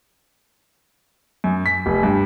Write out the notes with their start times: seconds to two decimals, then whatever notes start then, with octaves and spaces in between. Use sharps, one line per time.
1.44 F#2
1.66 B6
1.86 F1
2.03 G2